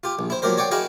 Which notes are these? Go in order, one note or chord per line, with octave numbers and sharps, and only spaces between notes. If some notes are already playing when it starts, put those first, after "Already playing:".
F4 G4
A#1
E4 C5
F3 F#3 A#3 G4 A#4 C5
C#5 D5 F#5 G5
E4 F#4 G#4 D#5 F5 G5